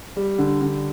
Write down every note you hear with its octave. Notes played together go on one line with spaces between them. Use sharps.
G3
D3
D3